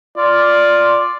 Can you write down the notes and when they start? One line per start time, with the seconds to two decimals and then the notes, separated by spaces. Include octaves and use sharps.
0.17 F4 D5